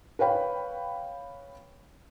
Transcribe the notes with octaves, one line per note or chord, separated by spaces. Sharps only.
B4 C#5 F5 G5 B5